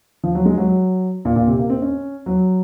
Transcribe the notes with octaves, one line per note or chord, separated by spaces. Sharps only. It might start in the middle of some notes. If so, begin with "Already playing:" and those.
F3
F#3
G#3
F#3
A#2
A#2
C3
A#3
C4
C#4
F#3